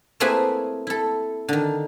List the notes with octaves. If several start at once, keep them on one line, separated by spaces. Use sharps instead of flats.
A3 A#3 C4 E4 G#4 B4
E4 A4
D3 D#3